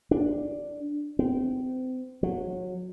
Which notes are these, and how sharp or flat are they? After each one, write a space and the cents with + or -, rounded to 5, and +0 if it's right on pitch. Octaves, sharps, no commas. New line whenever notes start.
D4 +0
C4 -30
F#3 -25